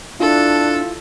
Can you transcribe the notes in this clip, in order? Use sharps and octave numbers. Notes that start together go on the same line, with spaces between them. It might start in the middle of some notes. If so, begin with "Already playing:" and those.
D4 E4 F4 A4